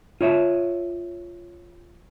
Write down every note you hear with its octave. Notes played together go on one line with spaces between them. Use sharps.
F4 C#5 E5